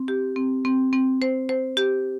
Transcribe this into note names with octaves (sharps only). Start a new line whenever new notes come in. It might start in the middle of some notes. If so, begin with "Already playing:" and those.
Already playing: C4
G4
C4
C4
C4
C5
C5
G4